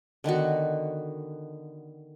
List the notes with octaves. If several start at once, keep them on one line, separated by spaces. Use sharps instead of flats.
D3 D#3 B3 F#4